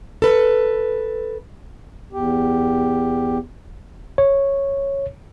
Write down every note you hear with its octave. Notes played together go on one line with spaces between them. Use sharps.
A4 B4
E2 G4
C#5